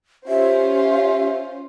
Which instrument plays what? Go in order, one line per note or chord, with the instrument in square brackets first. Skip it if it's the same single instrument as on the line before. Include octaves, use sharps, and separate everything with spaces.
[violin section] C#4 F4 C5 [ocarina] G4 [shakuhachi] E5